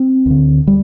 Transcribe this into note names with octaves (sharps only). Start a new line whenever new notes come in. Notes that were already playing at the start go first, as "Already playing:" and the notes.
Already playing: C4
D2 D3
G3